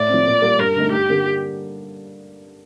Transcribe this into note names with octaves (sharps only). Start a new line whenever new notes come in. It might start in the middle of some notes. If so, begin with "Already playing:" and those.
Already playing: A2 D5
F3 C4
A#2
G3 A#3 F4
G2 A#4
D3 A3 D#4
G2 G4
D3 G3 A#3